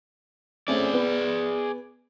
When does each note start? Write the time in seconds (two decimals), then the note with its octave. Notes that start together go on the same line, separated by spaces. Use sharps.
0.68 A3 C4 C#4 G#4 D5
0.93 B3